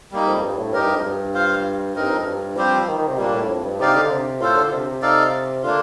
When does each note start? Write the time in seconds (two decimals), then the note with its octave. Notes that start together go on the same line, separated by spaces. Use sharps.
0.12 G3 A#3 D#4
0.27 F2
0.43 G2
0.58 A2
0.73 G2 D#4 G4 A#4
0.84 G2
0.94 F2
1.04 G2
1.34 F4 C5 F5
1.96 G2 C4 D#4 A#4
2.11 F2
2.26 G2
2.57 F3 G3 C4 G4 C5
2.88 D#3
2.98 D#3
3.08 C3
3.18 A#2 G3 A#3 D4
3.33 A2
3.49 F2
3.64 G2
3.80 C3 D#4 G4 D5 F5
3.95 D3
4.11 C3
4.41 A2 F4 A4 C5
4.56 D3
4.72 C3
4.86 C3
5.02 D#4 A4 D5 F5
5.63 D3 A#3 D4 F4